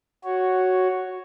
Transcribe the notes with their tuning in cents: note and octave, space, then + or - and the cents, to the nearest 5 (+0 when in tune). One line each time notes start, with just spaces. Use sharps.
F#4 +5 C#5 +0